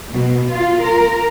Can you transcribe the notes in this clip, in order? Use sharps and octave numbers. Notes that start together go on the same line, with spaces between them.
B2
F4
A#4